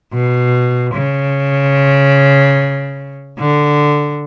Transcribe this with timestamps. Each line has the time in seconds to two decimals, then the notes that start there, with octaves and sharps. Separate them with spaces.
0.13 B2
0.94 C#3
3.39 D3